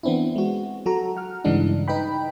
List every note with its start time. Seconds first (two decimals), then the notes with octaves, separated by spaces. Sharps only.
0.03 E3 B3 C4 D4 E4
0.36 G#3 F#4
0.86 F#3 F#4 A4 A#5
1.17 F#5 F6
1.44 G2 C#3 E3 G#3 D4 D#4
1.88 D#4 B4 D#5 G5 B5